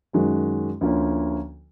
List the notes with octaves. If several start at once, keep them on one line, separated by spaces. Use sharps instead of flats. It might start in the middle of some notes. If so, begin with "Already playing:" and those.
F#2 D#3 G#3 C#4 F#4
D2 D3 F3 A#3 C#4